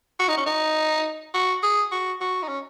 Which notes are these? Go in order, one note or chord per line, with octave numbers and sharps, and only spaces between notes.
F#4
D#4
C#4
D#4
F#4
G#4
F#4
F#4
D#4
C#4